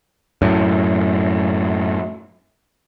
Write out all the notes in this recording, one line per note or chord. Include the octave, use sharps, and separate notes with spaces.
F#2 A2